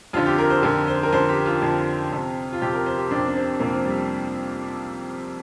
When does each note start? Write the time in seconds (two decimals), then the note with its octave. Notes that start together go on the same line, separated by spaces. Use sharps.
0.13 F2 D3 F4
0.26 G4
0.38 A#4
0.50 C5
0.63 F2 D3 A#4
0.88 C5
1.03 A#4
1.12 F2 D3 C5
1.29 G4
1.46 F4
1.62 F2 D3
2.12 F2 C3
2.53 F4
2.61 F2 C3 G4
2.74 A#4
2.86 C5
2.98 G4
3.11 F2 C3 D4
3.28 D4
3.36 C4
3.60 F2 C3 A#3
3.73 F3
3.85 G3